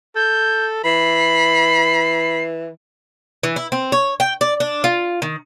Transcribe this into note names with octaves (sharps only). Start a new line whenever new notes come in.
A4 G6
E3 B5 C7
E3
E4
C4
C#5
G5
D5
D4
F4
D#3